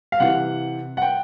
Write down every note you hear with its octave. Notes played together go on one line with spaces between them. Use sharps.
F5
C3 E3 F#5
F#5
G5